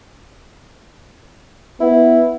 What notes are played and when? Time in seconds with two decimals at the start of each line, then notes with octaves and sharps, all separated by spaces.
1.80 B3 E4